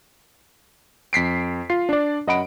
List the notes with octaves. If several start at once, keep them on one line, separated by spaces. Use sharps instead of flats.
F2 B6 C7 D7
F4 C7
D4 D5
F#2 D#5 F#5 B5 D7